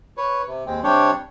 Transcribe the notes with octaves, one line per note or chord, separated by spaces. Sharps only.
B4 C#5
C3
D#2 G#3 C4
C3 G3 C4 D4 G4 C#5